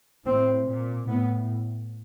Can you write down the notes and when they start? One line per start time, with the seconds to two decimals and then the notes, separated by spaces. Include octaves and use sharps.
0.26 A2 C4
0.67 A#2
1.08 A2 B3